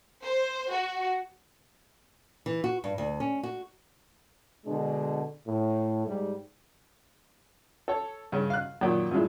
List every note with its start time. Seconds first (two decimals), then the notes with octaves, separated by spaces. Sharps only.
0.24 C5
0.71 F#4
2.46 E3
2.64 F#4
2.84 G2
2.98 D2
3.20 C#4
3.43 F#4
4.66 B2 D3 G#3 D4
5.47 A2
6.06 G#2 G3
7.88 A4 C#5
8.32 G2 C#3
8.50 F5 F#6
8.81 F#2 A#2 D#3
9.11 G2 A#2 F3 G#3 E4